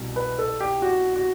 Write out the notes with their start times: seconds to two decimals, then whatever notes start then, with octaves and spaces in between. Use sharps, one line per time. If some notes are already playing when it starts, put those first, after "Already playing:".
Already playing: C2 B2
0.16 B4
0.39 A4
0.60 G4
0.82 F#4
1.16 F#4